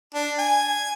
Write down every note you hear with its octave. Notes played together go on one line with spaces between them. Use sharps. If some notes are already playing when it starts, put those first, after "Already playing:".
D4
G#5